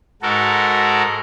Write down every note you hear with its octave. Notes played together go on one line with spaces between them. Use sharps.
G#2 F#4 A4 A#4